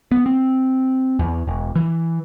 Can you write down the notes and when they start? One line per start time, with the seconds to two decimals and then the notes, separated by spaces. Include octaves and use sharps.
0.12 B3
0.26 C4
1.19 E2
1.47 E1
1.75 E3